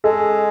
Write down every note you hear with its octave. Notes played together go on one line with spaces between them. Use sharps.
G#3 A4